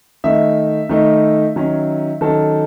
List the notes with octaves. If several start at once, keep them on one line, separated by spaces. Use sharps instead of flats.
D#3 A3 D#4 E5
D#3 A3 D#4
D#3 F#3 C#4
D#3 F#3 C#4 A4